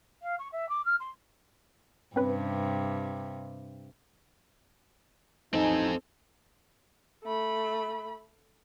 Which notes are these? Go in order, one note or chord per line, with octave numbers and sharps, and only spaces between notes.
F5
C#6
E5
D6
F6
C6
G2 C3 C4 C#4 B4
A1 C4 D#4 A4 G#5
A3 B5